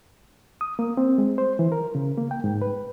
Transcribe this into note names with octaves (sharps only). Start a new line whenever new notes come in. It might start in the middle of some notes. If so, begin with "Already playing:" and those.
D#6
A#3
C4
G#3
C5
E3
A#4
C#3
A#3
G5
G#2
B4